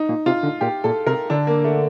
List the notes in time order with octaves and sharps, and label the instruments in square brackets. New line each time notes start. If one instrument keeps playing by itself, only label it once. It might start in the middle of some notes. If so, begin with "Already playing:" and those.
Already playing: [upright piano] D#4
[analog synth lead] A#2
[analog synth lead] C3 [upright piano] F4
[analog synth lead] D3
[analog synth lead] A#2 [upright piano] G4
[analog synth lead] A#2 [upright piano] A4
[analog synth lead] C3 [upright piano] A#4
[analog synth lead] D3 [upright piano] D4
[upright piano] A#3
A3